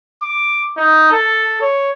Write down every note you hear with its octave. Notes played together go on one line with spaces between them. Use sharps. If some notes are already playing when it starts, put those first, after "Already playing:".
D6
D#4
A4
C#5